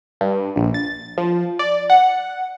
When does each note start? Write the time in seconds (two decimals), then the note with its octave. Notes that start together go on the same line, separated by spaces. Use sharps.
0.21 G2
0.56 A#1
0.74 A6
1.18 F3
1.59 D5
1.90 F#5